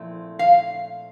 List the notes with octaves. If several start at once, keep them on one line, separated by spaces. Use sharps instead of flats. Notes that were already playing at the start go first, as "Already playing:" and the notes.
Already playing: A#2 F3 A3 C4 E4
F5